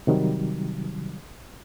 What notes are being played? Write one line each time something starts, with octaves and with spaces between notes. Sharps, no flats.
C3 D#3 F#3 G3